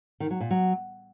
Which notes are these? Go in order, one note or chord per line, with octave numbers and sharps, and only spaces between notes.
D#3
F#3
A#2
F#3